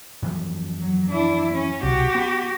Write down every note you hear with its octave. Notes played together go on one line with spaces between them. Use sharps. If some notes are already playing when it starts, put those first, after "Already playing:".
F#2 E3 F3
F#3
D4 E4
C#4
C2 B2 F#4 G4
B3